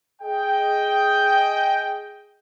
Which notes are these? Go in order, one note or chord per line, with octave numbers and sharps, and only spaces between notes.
G#4 D#5 G5